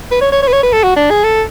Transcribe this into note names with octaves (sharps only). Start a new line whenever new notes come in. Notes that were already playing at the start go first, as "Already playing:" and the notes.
B4
C#5
C#5
C#5
B4
C#5
B4
A4
F#4
D4
G#4
A4